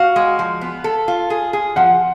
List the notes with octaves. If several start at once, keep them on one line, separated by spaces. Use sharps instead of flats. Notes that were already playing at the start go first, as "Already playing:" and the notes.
Already playing: F#4 F5
G#3
F3
B3
A4
F4
G#4
G#4
F3 F#5